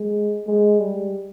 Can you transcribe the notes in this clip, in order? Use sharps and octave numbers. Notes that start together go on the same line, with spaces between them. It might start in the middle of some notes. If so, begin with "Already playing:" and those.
Already playing: G#3
G#3
G3